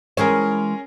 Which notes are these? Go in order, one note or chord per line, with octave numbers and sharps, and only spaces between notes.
E3 G#3 C#4 G#4 A#4 C5